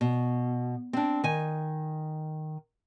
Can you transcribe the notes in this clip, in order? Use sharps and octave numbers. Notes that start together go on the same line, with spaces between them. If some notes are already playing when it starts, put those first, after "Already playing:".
B2
C4 D4
D#3 G#5